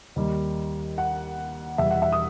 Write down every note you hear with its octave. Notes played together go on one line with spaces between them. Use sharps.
D#2 D#3 G3
F#5
E2 B2 G3 E5
F#5
E5
D#6